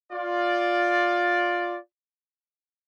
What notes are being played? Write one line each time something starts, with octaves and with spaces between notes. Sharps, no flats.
F4 D5